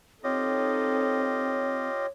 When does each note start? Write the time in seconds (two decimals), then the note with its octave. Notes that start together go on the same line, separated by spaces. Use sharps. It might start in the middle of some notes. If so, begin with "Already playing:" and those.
0.24 C4 D#4 F4 G4 A4 C#5 D#5